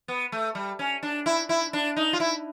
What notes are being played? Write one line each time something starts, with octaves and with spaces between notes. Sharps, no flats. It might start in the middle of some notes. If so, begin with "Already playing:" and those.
B3
A3
G3
C#4
D4
E4
E4
D4
D#4
F4
E4